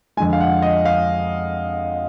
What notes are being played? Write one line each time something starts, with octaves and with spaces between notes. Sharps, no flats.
F2 D3 G#3 G#5
F5
F#5
D#5
F5